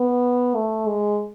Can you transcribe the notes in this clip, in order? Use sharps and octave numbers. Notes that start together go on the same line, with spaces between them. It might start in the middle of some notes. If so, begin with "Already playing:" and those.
Already playing: B3
A3
G#3